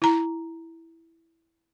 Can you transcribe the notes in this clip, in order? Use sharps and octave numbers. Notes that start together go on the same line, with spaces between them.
E4 A#5